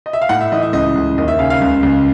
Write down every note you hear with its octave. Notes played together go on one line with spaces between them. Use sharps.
D#5
E5
F5
A2 F#5
E5
E3 D#5
E5
C#2 D#5
C#2
D#2 D#5
E5
C#3 F5
F5
C#2
C#2